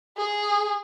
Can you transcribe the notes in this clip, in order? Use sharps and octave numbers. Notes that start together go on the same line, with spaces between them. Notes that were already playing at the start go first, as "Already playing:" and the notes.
G#4